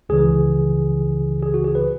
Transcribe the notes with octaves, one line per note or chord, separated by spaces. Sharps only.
C#2 C#3 E3 G#4
G#4
F#4
G#4
B4